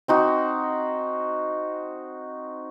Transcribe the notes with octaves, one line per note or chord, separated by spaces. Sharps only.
C4 D#4 F#4